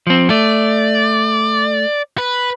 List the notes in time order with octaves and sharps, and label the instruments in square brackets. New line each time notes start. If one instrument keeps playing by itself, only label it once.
[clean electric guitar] F3 C4
[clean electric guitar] A3 [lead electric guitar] D5
[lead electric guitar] B4